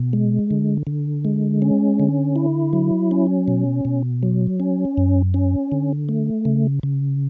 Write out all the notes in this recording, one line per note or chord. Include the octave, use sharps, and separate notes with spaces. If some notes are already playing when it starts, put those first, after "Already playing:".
Already playing: B2
G#3
D3
D3
G#3
C#4
D3
E4
F#3
C#4
B2
B2
F#3
C#4
F#2
C#4
D3
A3
C#3
C#3